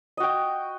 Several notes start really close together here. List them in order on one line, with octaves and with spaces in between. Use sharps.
D#5 F#4 G5